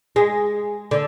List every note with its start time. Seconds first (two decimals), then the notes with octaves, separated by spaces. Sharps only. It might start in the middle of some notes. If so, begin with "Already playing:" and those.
0.16 G#3
0.91 D3